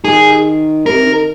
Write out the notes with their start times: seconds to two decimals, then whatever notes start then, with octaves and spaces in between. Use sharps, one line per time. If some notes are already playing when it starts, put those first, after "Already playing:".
0.04 D#3 G#4
0.86 C3 A#4
1.07 D#3